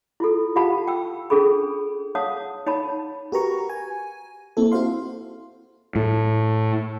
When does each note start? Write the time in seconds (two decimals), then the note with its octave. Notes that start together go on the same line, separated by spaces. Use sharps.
0.20 E4 F4 A4
0.56 F4 G4 F5 F#5 A5 B5
0.87 G5 E6
1.30 C#4 D4 G#4 A4 B5
2.15 C#5 F5 F#5 A5 D#6
2.66 D#4 C#5 A5 B5
3.32 F#4 G4 A#4 B4 A#5 C#6
3.70 G#5
4.57 A#3 C4 E4 A4
4.72 E4 F#4 C5 F5 C6
5.96 A2